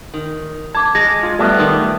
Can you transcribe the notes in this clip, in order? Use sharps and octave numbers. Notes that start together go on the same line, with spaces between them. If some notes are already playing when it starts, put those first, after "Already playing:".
D#3
A5 D6 G#6
G#3 G#6 A#6
F4
G3 A3 B3 D5 E5 A5
A#2 D#3